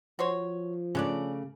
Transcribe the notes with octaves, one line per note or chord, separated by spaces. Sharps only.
F3 F#4 C5 C#5
C#3 A3 C#4 D4 D5